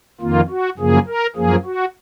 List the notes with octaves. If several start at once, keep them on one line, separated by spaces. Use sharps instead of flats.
F2 D#3 A#3 F4
F#4
F#2 C#3 F3 A#3 G#4
A#4
F#2 F3 A#3 G#4
F#4